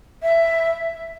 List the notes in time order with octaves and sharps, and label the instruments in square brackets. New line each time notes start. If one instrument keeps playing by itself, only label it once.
[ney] E5